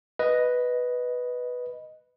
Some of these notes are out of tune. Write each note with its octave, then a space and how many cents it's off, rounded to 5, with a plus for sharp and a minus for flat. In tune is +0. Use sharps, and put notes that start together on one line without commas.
B4 +0 D#5 +0